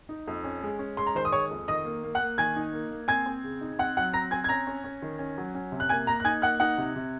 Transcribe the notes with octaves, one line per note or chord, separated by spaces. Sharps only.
D#4
F2
C#4
G#3
C#4
G#3 C6
A#5
D#3 C5 C6
D#6
G#3 C#5 C#6
F2
D#3 D#5 D#6
A#3
A#3
F#5 F#6
A#3
D#3 G#5 G#6
D#4
A#3
A#3
C4 G#5 G#6
C4
C#3
D#4
C4 F#5 F#6
F#3 F#5 F#6
C4 A#5 A#6
C4 G#5 G#6
G#6
C#4 A#5 A#6
C#4
C#4
D#3
C#4
F#3
C#4
C3
F#6
A#3 G#5 G#6
A#3 A#5 A#6
F#6
D#4 G#5 G#6
A#3 F#5 F#6
D#4 F#5 F#6
C3
C3